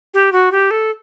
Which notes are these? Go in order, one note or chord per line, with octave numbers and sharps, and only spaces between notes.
G4
F#4
G4
A4